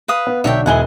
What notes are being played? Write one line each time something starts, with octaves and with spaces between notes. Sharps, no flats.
B4 F5 D#6
B3
B1 D3 D4 C#5 E5 G5
E1 E4 G#4 F#5 G#5 G7